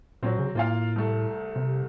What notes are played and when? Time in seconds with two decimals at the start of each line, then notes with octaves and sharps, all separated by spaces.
0.23 A#2 F#3 C4
0.39 C#3
0.55 A2 A#3 F4 F5
0.96 C2 A3
1.56 C3